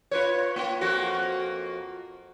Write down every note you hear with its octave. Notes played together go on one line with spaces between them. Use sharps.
F4 B4 C#5
A#3 F4
F2 A#3 F#4